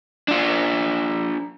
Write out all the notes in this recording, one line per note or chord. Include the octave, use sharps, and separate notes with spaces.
D4 F4